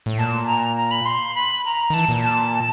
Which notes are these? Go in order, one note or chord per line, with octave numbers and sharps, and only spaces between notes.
A2
A#2 A5
A#5
A#5
B5
C6
B5
A#5
D#3
E3 A5
A#2
A5